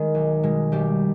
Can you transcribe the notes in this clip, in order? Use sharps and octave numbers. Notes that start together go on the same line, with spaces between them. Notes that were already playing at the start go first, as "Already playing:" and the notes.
Already playing: D#3 G#3
B1
B2 G#3
B1 G3 G4